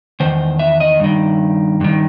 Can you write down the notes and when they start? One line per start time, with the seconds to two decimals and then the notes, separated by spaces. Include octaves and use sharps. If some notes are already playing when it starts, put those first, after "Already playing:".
0.20 E2 D#3 C5
0.59 E5
0.80 D#5
1.00 G2 D#3
1.81 G2 D#3